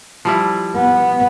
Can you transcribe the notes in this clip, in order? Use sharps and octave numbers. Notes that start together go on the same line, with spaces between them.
F3 G3 E4
B3